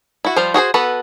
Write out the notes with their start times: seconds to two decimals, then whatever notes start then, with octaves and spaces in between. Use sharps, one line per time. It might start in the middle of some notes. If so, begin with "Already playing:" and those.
0.25 E4 F#4
0.36 F3 G3 F4 C5
0.54 F#4 G#4 A4 C5
0.74 B3 F#4 A4 B4